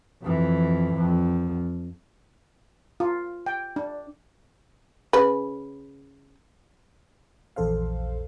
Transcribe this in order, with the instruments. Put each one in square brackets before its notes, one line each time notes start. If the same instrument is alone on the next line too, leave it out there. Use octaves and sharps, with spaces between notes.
[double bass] F2 E3
F2
[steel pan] F4
G5
D4
[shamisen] C#3 B4
[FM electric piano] A#1 E2 A4 C5 F5